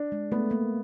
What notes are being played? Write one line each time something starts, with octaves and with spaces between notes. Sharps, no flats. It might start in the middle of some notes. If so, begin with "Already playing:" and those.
Already playing: D4
G#3
A3 B3
A#3